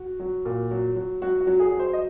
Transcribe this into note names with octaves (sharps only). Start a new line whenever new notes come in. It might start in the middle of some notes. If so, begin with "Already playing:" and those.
Already playing: F#4
F#3
A#2
F#3
F#3
F#3 F#4
F#4
F#3
G#4
F#3
C5
D#5